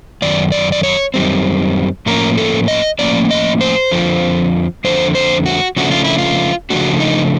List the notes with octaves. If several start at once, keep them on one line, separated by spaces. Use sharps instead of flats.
F#2 D#3 D5
D5
D5
C#5
F#2 D#3 G3 C4
A2 F3 A#3 C#4 A#4
A4
D#5
A2 F3 A#3 C#4 D5
D#5
C5
F2 D3 F3
F2 D3 F3 C5
C5
F#4
C#3 F3 A3 D4 F#4
F4
E4
F4
C#3 F3 A3 D4 F#4
D#4